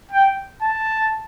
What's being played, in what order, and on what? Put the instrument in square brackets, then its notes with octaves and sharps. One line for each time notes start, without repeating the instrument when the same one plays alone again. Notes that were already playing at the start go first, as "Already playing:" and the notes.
[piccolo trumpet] G5
A5